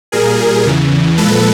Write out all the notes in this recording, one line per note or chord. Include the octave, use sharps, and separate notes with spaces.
A#2 G3 G#4 A#4
E2 C#3 E3
A#2 F3 G#3 A4 B4